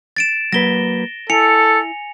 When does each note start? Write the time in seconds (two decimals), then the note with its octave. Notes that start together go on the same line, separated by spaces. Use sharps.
0.17 A6 D7 E7
0.53 F#3 A#3 B4 A#6 G7
1.30 E4 A4 G#5 C#7 F7